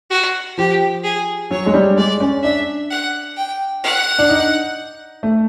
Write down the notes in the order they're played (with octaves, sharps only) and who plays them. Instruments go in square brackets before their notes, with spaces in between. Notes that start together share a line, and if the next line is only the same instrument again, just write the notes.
[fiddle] F#4
[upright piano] F3 [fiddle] G4
[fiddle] G#4
[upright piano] F#3 [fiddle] C#5
[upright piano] G#3
G3
[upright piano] G#3 [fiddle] D5
[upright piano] C#4
[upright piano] D4 [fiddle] E5
[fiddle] F#5
G5
F#5
[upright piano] D4
D#4
A3